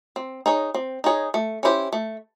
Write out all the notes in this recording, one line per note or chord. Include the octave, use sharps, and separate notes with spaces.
C4
D#4 G#4 C#5
C4
D#4 G#4 C#5
A3
C#4 E4 G4 C5
A3